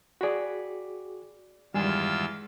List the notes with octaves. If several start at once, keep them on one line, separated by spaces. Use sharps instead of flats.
F#4 G#4 D5 B5 B6
E2 G2 D#3 G3 G#3 F4 G#4 E6